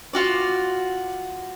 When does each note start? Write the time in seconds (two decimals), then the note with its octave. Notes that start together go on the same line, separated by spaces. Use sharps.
0.13 F4 F#4 D5